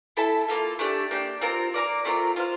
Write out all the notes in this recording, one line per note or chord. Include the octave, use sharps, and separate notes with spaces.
E4 A4 E5 A5
A#3 F4 A4
A3 D4 G4
A#3 D4 G4
C4 F4 A#4
A#3 F4 A#4 D5
A3 C4 F4 A#4
F4 C5 F5